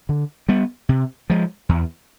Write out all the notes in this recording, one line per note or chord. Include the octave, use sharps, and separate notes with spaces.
D3
G3 B3
C3
F3 G#3
E2